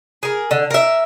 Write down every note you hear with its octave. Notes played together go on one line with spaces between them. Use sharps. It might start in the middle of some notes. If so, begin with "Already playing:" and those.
G#4 A#4
D3
A#4 E5